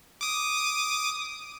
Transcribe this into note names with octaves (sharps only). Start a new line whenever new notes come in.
D6 D#6